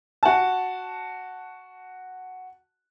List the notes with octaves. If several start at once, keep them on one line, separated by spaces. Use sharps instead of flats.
F#4 A5